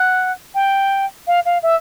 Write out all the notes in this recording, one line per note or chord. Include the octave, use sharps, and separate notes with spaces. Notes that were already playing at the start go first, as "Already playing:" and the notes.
Already playing: F#5
G5
F5
F5
E5